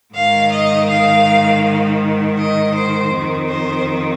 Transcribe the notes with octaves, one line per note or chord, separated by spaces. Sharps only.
G#2 D#3 F5
D#5
F5
D#5
C5
F2 D#3
C5